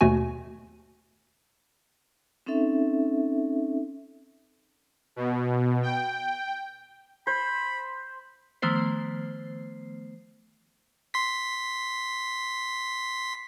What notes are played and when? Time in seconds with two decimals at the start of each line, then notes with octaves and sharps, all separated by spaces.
0.01 D#2 B2 A3 F#4 G#5
2.46 C4 C#4 D#4 A4 E5
5.16 B2
5.83 G5
7.27 C5 B5
8.62 D#3 F3 A3 B3 C5 C7
11.14 C6 B6